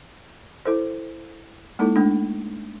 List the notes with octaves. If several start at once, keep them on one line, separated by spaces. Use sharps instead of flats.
E4 A4 C5
G#3 A#3 D#4 E4 A4
G#3 A3 D4